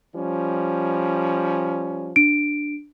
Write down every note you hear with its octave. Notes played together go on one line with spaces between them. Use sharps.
F3 G3 C#4
D4 D7